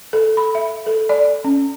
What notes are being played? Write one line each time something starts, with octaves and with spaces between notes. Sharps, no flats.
A4
B5
E5
A4
D5
C#4